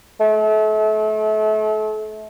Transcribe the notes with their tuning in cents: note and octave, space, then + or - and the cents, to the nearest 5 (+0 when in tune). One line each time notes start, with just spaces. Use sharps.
A3 -35